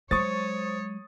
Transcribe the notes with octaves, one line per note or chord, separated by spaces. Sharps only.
F#3 G#3 C5 C#5 C#6 D#6 A6